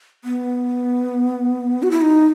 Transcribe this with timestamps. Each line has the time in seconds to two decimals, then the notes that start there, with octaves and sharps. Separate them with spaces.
0.24 B3
1.83 F#4
1.91 E4
2.01 D#4